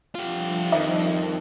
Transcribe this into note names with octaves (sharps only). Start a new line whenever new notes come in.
F3 G3 D4 F4 G4
F2 D#3 D#5